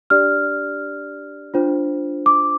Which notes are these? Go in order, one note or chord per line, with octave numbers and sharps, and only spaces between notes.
D4 G4 D5 F6
D4 F4 C5
D6